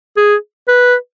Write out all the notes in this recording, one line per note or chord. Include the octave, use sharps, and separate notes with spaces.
G#4
B4